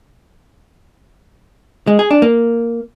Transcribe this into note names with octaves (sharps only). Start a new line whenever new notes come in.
G#3
G#4
D4
A#3